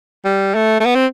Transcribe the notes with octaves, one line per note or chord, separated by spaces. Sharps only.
G3
A3
A3
B3
C4